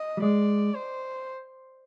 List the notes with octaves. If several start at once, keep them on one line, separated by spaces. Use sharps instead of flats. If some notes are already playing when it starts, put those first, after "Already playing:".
Already playing: D#5
G3
G#3 D5
C5